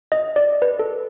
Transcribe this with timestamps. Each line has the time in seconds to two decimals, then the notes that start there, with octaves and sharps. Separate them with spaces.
0.12 D#5
0.36 D5
0.62 B4
0.79 A4